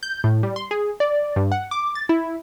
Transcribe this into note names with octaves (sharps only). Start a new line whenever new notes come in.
G6
A2
G3
C6
G#4
D5
G2
F#5
D6
A6
E4